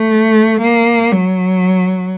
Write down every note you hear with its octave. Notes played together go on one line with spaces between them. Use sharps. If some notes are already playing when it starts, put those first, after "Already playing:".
Already playing: A3
A#3
F#3